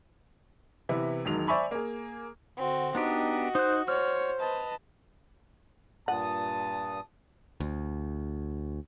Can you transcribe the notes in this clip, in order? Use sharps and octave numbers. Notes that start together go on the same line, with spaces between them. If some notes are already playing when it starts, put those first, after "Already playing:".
C3 E3 B3 E4
E1 D#3 F#3 G#3 F7
C5 D5 E5 G#5 B5 C#6
A#3 G#4
D3 C4 F#4
B3 D4 D#4 F#4 G4 D#5
D#4 C5 F#6
C5 C#5 F6
B4 D#5 A5
G2 A#2 F#5 A5 D#6
D2